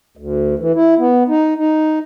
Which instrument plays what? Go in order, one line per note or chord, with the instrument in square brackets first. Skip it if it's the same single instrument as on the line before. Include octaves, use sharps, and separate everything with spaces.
[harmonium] D2
E3
E4
B3
D#4
D#4